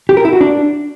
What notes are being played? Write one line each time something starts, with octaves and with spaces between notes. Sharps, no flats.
G4
A#4
E4
F#4
D4